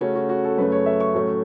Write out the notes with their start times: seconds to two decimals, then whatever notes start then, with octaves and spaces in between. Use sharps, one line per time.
0.01 C#3 A3 C#4 F#4
0.15 F#4
0.29 F#4
0.44 A4
0.57 F#2 C#3 A3 B4
0.72 C#5
0.86 E5
1.00 C#6
1.14 A2 F#3 A3 C#4